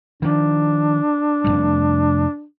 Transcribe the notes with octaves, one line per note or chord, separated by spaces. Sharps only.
D#3 F3 D4
F1 C#2 G3